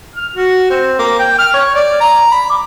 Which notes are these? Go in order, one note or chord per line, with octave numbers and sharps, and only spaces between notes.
F6
F#4
C4
A#3
G5
F6
C#5
D5
A#5
B5
D6